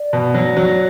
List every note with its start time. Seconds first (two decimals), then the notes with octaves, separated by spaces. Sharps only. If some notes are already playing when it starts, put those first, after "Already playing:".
Already playing: D5
0.13 B2
0.34 F#3
0.57 F#3